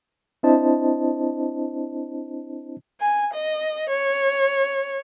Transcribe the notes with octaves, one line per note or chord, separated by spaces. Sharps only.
C4 D4 E4 C5 D#5 A5
G#5
D#5
C#5